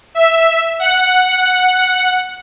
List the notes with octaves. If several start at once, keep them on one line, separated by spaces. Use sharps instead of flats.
E5
F#5